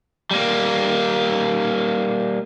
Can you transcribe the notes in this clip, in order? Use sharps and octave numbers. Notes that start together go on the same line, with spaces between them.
G3 A#3